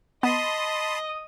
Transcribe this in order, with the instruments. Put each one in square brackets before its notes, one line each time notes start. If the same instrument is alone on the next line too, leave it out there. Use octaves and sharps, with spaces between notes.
[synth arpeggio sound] B3 [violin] D#5 [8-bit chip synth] A5 B5 C6 [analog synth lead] D#6